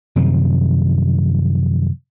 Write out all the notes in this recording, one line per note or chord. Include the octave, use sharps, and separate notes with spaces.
F#2 C3 D#3 F3